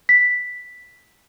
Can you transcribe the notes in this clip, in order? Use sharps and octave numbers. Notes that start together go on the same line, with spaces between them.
B6